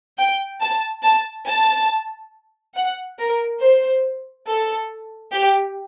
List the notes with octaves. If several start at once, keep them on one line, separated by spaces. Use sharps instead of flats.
G5
A5
A5
A5
F#5
A#4
C5
A4
G4